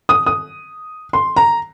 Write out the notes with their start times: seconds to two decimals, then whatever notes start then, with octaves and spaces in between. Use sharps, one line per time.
0.09 D#6
0.26 D#6
1.13 C6
1.36 A#5